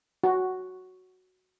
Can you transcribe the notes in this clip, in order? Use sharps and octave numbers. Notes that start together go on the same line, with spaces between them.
F#4